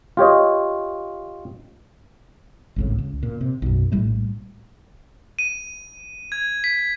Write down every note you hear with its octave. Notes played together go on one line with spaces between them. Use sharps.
F4 G4 C#5 D#5
G#1 C#2 A2
C#2
A#2
C3
B1 F#2
A#1 A2 G3 A3
D#7
G#6
B6